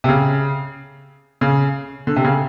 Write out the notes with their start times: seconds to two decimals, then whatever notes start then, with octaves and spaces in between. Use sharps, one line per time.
0.04 C3
0.09 C#3
1.41 C#3
2.07 D3
2.16 C3
2.24 C#3